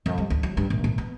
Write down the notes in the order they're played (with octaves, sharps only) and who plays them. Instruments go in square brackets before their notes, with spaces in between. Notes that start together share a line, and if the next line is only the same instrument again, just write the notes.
[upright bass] F2
G3
D2
F#3
G2
A#1
A#2
B3